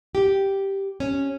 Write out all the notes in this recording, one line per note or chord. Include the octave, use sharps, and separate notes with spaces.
G4
C#4